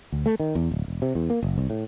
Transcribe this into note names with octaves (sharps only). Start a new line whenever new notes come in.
D2
A3
D#3
E2
D1
E1
C3
E2
A#3
F#1
C2
A2